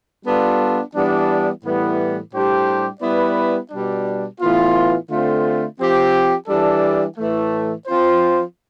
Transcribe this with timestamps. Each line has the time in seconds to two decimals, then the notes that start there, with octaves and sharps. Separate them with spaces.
0.24 G3 B3 D4 F4 A4
0.94 E3 G3 B3 D4
1.63 A2 E3 G3 B3
2.33 A2 G3 D4 G4 C5
3.02 G3 B3 E4 B4 D5
3.71 B2 G3 D4
4.41 A2 E3 B3 F4
5.10 D3 A3 C4 F4
5.79 F3 C4 G4
6.48 E3 G3 D4 A4 D5
7.18 A2 E3 A3
7.87 F3 C4 F4 C5